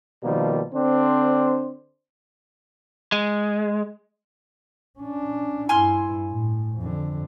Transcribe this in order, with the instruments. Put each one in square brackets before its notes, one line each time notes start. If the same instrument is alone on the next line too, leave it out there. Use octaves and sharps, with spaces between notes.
[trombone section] B2 D#3 F3 G3 A#3
D3 C4 D4 C5
[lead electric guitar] G#3
[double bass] C#4 D4
[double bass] G2 E4 [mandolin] G#5 C6 F6
[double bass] A2
F2 D3